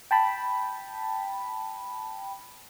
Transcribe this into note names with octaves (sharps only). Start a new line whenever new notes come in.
G5 A5 B5